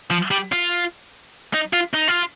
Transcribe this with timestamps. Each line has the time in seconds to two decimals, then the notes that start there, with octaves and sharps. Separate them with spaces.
0.10 F3
0.31 G3
0.52 F4
1.54 D#4
1.73 F4
1.94 D#4
2.08 F4